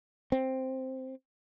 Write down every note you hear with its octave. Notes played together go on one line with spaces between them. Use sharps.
C4